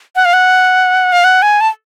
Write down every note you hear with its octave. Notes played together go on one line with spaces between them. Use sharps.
F#5
F5
F#5
F5
F#5
G#5
A5